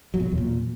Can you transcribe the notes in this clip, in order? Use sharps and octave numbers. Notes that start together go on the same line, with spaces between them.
F#3
B2
F#3
E2
A#2